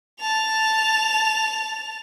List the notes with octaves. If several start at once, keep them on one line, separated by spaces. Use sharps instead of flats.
A5 F7